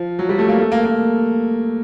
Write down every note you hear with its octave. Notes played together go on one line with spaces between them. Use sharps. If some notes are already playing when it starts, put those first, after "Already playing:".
Already playing: F3
F#3
G3
A3
A#3
A3
A#3
A#3